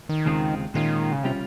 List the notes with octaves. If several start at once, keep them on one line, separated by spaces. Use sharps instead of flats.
D#3
D#2 C#3 G#3 C4 F4
A#2 D#3 G#3 C#4 F4
C#3
C3 G3 C#4 F4